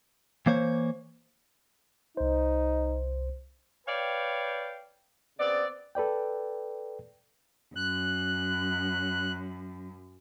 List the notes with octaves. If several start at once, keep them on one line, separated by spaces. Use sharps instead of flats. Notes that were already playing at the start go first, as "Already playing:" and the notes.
E3 A#3 C5 C#5
C2 D#4 C5
B4 C#5 D5 F5 G5
C#3 B3 C4 D5
A4 B4 D5 G5
F#2 F#6